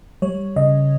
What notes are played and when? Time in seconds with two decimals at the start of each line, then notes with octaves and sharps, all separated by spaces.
0.22 G3 C#5
0.56 C#3 D#5